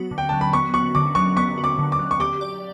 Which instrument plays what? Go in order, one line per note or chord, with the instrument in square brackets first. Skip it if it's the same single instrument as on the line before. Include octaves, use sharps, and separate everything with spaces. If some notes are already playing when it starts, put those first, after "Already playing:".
Already playing: [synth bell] F#3 B3 F#4
D3
[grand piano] G5
[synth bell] F#3 [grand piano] A5
[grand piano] B5
[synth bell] B3 [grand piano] C#6
[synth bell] F#4 [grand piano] C#6
[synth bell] D3 [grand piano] D6
[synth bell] F#3 [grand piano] C#6
[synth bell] B3 [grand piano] C#6
[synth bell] F#4
[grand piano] D6
[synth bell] D3
[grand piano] D6
[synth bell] F#3
[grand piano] C#6
[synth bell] G4 [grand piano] D6
[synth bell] D5